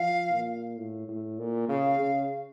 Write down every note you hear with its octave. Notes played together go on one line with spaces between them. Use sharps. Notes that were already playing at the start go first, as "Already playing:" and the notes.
Already playing: F3 F5
A#2
A2
A2
A#2
C#3 F5
C#3